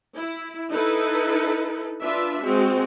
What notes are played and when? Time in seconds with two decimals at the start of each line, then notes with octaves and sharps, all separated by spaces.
0.17 E4
0.72 D#4 E4 A4 B4
2.02 D4 F4 B4 E5
2.44 G#3 C4 F#4